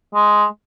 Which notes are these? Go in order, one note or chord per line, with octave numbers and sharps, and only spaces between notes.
G#3